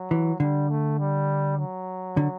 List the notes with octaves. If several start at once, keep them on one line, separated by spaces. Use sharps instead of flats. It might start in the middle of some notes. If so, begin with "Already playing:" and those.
Already playing: F#3
E3
D3 G3
A3
G3
F#3
D3